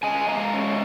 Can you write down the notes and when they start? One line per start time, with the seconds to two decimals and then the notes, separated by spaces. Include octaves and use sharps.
0.03 C#3 D#5 G#5
0.28 G#3 F5 A#5
0.54 C#4